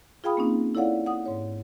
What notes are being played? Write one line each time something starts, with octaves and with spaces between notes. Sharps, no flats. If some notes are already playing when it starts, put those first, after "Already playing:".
F4 G#4 F5 G5 B5 D#6
A#3 C4 C#4 D#4
E4 A4 C#5 D5 F5 F#5
F#5 D#6
G#2 C#5